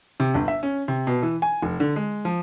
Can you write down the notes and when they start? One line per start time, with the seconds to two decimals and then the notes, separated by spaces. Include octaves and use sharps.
0.20 C3
0.34 G1
0.48 E5
0.63 C#4
0.88 C3
1.07 B2
1.23 E3
1.42 G#5
1.62 F1
1.80 D3
1.96 G#3
2.25 F3